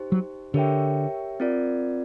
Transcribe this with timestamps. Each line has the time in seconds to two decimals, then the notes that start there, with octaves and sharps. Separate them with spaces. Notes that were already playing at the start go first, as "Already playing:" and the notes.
Already playing: D#4 G4 C5
0.12 F#3
0.54 D3 G4 A#4 C#5 E5 G5
1.40 C4 F4 A#4 D5